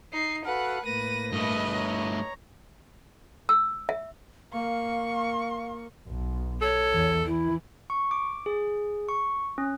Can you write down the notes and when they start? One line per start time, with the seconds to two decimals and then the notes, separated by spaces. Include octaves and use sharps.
0.13 D#4 C7
0.45 F#4 A4 B4 F5 F#5
0.85 A2 A#3 B4 A#6 D#7
1.32 G2 A3 B4 D#5
1.74 C#5 A#5
3.49 E6
3.89 E5
4.53 A#3 F5 C#6
6.08 B1
6.61 A4 C#5
6.92 E2 E3
7.26 E3 E4
7.90 C#6
8.11 D6
8.46 G#4
9.09 C#6
9.58 C#4